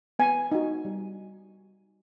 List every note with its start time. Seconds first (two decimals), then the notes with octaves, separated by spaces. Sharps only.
0.19 B3 G#5
0.52 D#4 F#4
0.85 G3